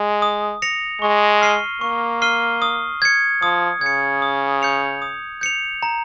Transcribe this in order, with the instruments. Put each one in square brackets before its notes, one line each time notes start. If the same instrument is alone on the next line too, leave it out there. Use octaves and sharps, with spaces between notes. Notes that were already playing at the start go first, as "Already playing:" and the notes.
Already playing: [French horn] G#3
[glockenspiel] D#6
A#6 C#7 F7
[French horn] G#3 [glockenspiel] C#6
[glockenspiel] F6 C7 D#7 G7
[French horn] A#3 [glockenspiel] C#6
[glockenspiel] F6 C7 D#7 G7
D#6
G#6 C#7
[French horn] F3 [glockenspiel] D#6
[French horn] C#3 [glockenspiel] G#6 C#7
[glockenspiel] D#6
G6 C#7 F7
D#6
G6 C#7 F7
A#5